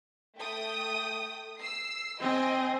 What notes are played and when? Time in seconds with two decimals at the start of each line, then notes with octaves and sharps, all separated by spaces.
0.39 A3 G5 D#6
1.59 E6 C7
2.21 C4 D#5 G#5